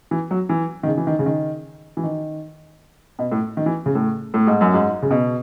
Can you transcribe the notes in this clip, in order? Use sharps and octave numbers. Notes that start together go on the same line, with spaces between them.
E3
F#3
E3
D#3
C#3
E3
D#3
C#3
D#3
E3
D#3
B2
A2
D#3
E3
C#3
A2
A2
G#2
F#2
G#2
C#3
B2